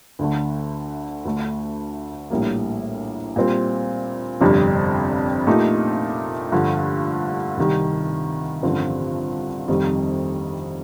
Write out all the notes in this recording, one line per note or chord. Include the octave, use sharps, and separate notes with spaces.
D2 D3 A3
D2 D3 A3
A#1 A2 G3 A#3
A#2 G3 C4
G1 F2 C3 G3 D4
A#2 A3 D#4 G4
G2 D3 F3
C2 C3 D#3 G3
A1 G2 D3 F3 C4
F1 F2 C3 D#3 G3